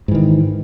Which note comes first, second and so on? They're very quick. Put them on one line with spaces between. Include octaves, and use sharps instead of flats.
G#2 E3 D#3